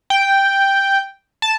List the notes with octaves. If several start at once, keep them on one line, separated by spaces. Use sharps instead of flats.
G5
A5